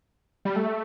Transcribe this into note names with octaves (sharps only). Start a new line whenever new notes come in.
G3
A3